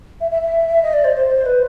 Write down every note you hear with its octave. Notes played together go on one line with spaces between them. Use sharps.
E5
E5
E5
D#5
D5
C5
C5
B4